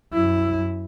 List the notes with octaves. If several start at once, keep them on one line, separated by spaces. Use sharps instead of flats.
F#2 E4